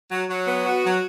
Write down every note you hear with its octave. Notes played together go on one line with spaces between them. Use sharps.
F#3
F#3
B3
F#4
F#3